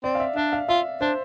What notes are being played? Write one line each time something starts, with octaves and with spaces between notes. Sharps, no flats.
C4 D5
F5
E5
D4 E5
F5
F4 E5
D4 C5